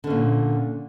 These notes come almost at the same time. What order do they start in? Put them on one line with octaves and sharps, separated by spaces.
D3 C#4 A#2